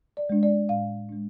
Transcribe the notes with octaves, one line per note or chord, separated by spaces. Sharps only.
D5
G#3 D4
D5
A2 F5
G#3 D4